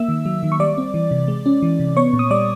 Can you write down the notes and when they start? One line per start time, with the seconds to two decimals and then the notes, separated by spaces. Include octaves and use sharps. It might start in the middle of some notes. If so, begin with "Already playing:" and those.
Already playing: A#3 E5 E6
0.08 D#3
0.26 F#3
0.43 D#3
0.52 C#6
0.60 G3 D5 D6
0.78 C4
0.94 E3
1.11 C3
1.28 G#3
1.46 C#4
1.62 E3
1.80 C3
1.97 B3 C#5 C#6
2.13 A#2
2.19 D#6
2.31 G3 D5 D6